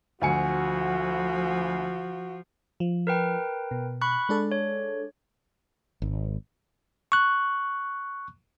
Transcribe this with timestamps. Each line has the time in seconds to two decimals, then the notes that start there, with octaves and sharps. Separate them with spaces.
0.22 D2 F3 F#4 G#5 C#7
2.80 F3
3.07 A#4 B4 G5
3.71 B2
4.01 B5 C#6 F#6
4.29 G#3 D4 A4
4.52 C#5
6.02 G#1
7.12 C#6 F#6